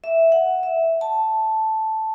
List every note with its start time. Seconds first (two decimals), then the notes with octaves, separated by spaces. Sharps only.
0.04 E5
0.32 F#5
0.63 E5
1.01 A5